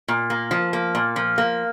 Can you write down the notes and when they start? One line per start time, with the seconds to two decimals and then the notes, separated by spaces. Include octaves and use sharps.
0.08 A#2
0.30 A#3
0.51 F3
0.73 A#3
0.95 A#2
1.16 F3
1.38 A#3